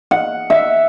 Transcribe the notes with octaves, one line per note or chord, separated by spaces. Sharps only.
F#5
E5